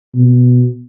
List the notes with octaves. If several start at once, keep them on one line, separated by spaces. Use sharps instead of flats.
B2